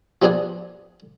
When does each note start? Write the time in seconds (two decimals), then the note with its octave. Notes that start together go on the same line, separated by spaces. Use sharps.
0.22 F3 G3 B3 D4 G#4